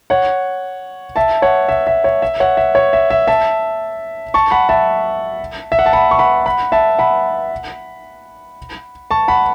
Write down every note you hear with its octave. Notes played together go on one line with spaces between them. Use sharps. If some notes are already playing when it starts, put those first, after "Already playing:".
C#5 F#5
E5 A5
C#5 F#5
E5
E5
C#5
E5
C#5 F#5
E5
C#5
E5
E5
E5 A5
A5 C#6
F#5 B5
E5 A5
E5
F#5
A5
F#5 B5
C#6
F#5 B5
F#5 B5
E5 A5
F#5 B5
A5 C#6
F#5 B5